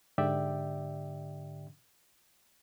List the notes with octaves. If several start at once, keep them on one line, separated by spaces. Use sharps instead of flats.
G#2 D3 G4 D5 E5 G5